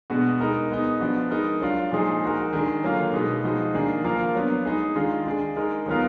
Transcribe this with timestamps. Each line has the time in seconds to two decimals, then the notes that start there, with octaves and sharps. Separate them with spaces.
0.10 B2 G#3 B3 D4 F#4
0.40 G#3 D#4 A#4
0.71 G#3 B3 D#4
1.00 F3 B3 D4 F#4
1.31 G#3 D#4 A#4
1.61 F#3 D4 F4
1.92 A#2 F3 G#3 D#4 G#4
2.23 G#3 D#4 F#4 A#4
2.53 D#3 G#3 D4 G#4
2.83 D3 F#3 A#3 F4
3.13 B2 G#3 B3 D#4
3.44 F3 G#3 D#4 F#4
3.74 D#3 A#3 D4 G#4
4.04 F3 A#3 F4 A#4
4.35 F#3 B3 D4
4.65 G#3 D#4 G#4
4.95 D#3 G#3 D4 F4
5.26 G#3 D4 G#4
5.56 G#3 D#4 A#4
5.86 D#3 F#3 B3 F4 A#4